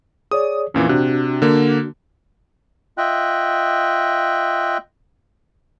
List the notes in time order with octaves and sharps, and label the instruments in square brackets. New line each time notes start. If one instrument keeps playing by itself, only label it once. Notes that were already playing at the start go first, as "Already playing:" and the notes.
[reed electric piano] G#4 C#5 D5 [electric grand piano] D#6
[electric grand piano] F2 A#2 E3 [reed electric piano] C#4
[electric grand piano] C3 [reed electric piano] D4 F#4 F#6
[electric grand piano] D3 A#3
[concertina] F4 D#5 E5 G5 F#6